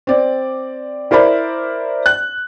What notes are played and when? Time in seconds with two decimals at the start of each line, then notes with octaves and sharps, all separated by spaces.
0.07 C4 D5
1.11 E4 A#4 C5 D5 B5
2.06 F#6